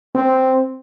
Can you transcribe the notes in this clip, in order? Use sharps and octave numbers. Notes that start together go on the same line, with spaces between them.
C4